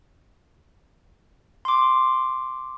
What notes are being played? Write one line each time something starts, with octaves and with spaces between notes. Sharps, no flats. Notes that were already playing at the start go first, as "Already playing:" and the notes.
C6 D6